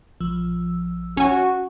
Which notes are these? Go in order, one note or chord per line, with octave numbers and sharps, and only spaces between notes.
A#1 F3 E6
C#4 F#4 G#5